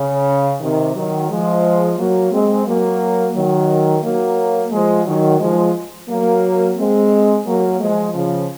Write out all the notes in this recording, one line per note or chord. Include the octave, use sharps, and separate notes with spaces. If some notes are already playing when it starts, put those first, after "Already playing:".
Already playing: C#3
C3 D#3
D#3 F#3
F3 G#3
F#3 A#3
G#3 C4
F#3 A#3
D#3 F#3
F#3 A#3
F3 G#3
D#3 F#3
F3 G#3
F#3 A#3
G#3 C4
F#3 A#3
F3 G#3
C#3 F3